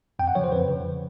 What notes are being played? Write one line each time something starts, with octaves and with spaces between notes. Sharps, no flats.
F2 G5
F#5
C#3 F3 C#5
C5
F2 B4
C#3 F3